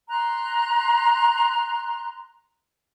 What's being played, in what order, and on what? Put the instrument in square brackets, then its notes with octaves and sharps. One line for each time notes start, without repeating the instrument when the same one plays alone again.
[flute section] A#5 C6 F#6